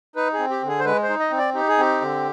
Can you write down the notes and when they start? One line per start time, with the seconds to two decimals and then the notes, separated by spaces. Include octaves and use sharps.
0.16 D#4 B4
0.34 C4 G#4
0.50 G4
0.63 D3
0.68 G#4
0.79 C5
0.85 G#3 B4
1.03 C5
1.09 D#4
1.20 D#5
1.31 C4
1.38 D5
1.54 D#4 G4
1.68 G#4
1.78 C4 G4
2.01 D3